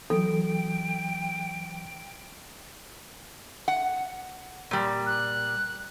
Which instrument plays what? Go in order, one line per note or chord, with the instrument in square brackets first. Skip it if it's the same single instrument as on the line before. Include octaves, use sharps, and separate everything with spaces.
[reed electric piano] E3 F#3 [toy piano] A4 [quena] G5
[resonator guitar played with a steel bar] F#5
A#2 G3
[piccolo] F#6